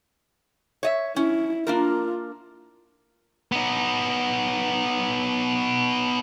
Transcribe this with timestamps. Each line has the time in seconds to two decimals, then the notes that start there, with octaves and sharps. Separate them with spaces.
0.83 C#5 D#5 E5
1.16 C#4 E4
1.67 A#3 D4 F4 A#4
3.52 B3 D#4